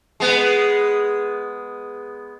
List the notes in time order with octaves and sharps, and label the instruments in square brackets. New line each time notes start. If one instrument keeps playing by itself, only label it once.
[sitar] G#3 B3